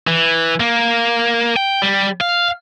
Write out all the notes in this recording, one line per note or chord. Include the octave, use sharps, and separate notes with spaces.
E3
A#3
G5
G3
F5